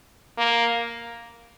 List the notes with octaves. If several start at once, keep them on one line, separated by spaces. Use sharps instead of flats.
A#3